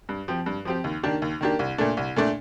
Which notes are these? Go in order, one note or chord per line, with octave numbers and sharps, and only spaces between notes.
G2
F3 C4 G4
G2
F3 C4 G4
D#2
D#3 A#3 D4 G4
D#2
D#3 A#3 D4 G4
C2
A#2 A3 D4
C2
A#2 A3 D4